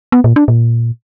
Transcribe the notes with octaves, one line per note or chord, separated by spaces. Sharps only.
B3
A#2
D4
A#2